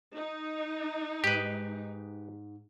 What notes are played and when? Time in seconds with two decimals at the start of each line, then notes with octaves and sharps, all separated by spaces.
0.15 D#4
1.24 G#2 G4 B4